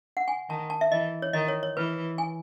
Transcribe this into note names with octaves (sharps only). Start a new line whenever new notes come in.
F#5
G#5
D#3 A5
A5
E5
E3 D#5
C#5
D#3 D#5
C#5
C#5
E3 B4
G#5